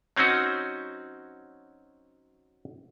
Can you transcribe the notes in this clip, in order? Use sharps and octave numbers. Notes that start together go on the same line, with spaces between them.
F#3 C4 C#4 D#4 F#4